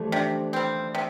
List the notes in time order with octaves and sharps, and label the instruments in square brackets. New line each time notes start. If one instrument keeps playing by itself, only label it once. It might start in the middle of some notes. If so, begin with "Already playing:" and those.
Already playing: [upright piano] E3 F3 G3 A3
[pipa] C3 [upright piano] D4
[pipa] G3 C4
C3